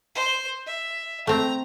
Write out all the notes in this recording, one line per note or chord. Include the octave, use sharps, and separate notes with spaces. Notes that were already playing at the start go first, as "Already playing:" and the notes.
C5
E5
A3 C4 A#5